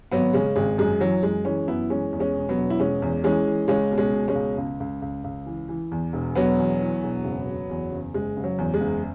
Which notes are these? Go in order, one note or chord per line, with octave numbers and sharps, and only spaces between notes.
G#1 F#3 B3
C#3 G#3 C#4
G#1 G#3
F#2 G#3
E3 F#3
F#2 G#3
E3 G#3 C#4
F#2 B3 E4
E3 G#3 C#4
E2
G#3 C#4
E1
F#3 B3
E1
E4
E1 G#3 C#4
E2
E3 G#3 C#4
E3
C#2 G#3 C#4
B2
G#3 C#4
B2
G#3 C#4
C#2
C#2
C#2
C#2
C#2
E3
E3
E2
E1
E1 F#3 B3
E2
E3
E1
F#1
F#1
E2
F#1
F#1 G#3
F#1
F#3
E2
G#3
F#1